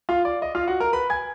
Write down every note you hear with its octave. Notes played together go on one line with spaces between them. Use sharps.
F4 F5
D5
D#5
F4 F5
F#4 F#5
A#4 A#5
B4 B5
G#5 G#6